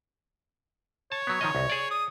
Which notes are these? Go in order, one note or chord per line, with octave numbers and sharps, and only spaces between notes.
C#5 A5
F#3 B3
D#3 F3 D#5
C2
G#4 D5
D#6